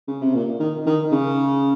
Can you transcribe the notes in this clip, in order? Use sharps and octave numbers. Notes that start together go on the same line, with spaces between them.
C#3
C3
A#2
D#3
D#3
C#3